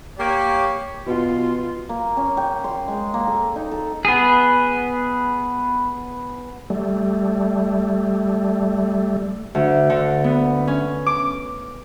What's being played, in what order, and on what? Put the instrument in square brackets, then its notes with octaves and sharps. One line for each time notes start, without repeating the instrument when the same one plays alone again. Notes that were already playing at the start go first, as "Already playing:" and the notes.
[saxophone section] A#3 [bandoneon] G4 [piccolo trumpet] C#5
[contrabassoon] B2 [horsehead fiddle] F4
[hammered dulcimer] A#3
C#4
G5
C6
G#3
A#3
A4
D#4
A4
[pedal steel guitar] B3 G#4
[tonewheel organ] G3 A3
[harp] D2
D3
B3
C#4
D6